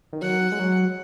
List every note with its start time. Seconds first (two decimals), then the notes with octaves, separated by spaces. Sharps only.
0.13 D#3
0.22 F#3 F#5
0.52 G#3
0.59 F#3